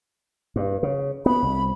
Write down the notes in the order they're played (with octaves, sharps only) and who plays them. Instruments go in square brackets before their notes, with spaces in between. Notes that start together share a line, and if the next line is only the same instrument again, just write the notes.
[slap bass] G2
C#3
[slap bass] B3 [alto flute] B5
[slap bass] C2